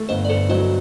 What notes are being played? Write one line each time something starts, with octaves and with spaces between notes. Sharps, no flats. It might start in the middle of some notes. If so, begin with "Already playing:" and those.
Already playing: A3
G1 C5 D#5
D5
G1 A4 C5
F#3 C5 D#5